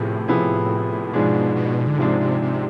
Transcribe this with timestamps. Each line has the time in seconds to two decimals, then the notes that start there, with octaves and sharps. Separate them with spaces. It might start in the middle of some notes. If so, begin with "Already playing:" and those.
Already playing: A2 C3 F3 B3 G#4
0.28 C3 F3 B3 E4 G#4
1.13 G#2 B2 F3 G#3 D4 G#4
1.56 B2
1.88 D3
1.99 G#2 C3 F3 G#3 D4 G#4
2.20 C3
2.42 C3